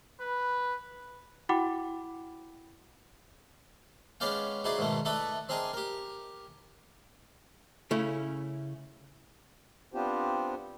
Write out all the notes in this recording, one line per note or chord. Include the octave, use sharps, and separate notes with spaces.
B4
E4 F#4 F#5 G5 B5 D6
G#3 B3 C#4 D5 F5 G5
D#4 E4 F#4 G#4 C5 D5
G#2 B2 D#3 G#3 A3
A3 D#4 A4 B4 D5 E5
C4 D4 G#4 A#4 D#5
G4 A#4
C#3 A3 C#4 E4
B3 C4 D4 F4 G4 C5